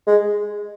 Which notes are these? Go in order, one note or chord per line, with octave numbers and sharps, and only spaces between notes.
G#3